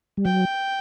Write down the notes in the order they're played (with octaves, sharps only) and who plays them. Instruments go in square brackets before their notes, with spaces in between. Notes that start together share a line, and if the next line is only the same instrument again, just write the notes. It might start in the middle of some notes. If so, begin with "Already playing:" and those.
[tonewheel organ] G3
[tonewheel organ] F#3 [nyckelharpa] G5